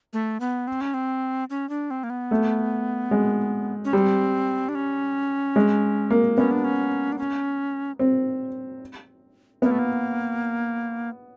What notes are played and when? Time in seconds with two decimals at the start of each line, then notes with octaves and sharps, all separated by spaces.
0.13 A3
0.40 B3
0.67 C4
0.81 C#4
0.94 C4
1.50 C#4
1.69 D4
1.91 C4
2.04 A#3
2.10 B3
2.31 A3
3.11 G#3
3.85 C#4
3.93 G3 C4
4.69 D4
4.75 C#4
5.56 G#3
6.10 A#3
6.37 B3 C#4
6.51 D4
6.64 C#4
7.12 D4
7.18 C#4
7.99 C4
9.62 A#3 B3
9.71 A3
9.79 A#3